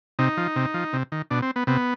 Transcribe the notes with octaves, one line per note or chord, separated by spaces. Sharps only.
C3 D#4
F3
C3
F3
C3
D#3
B2 D4
C4
B3
C3 B3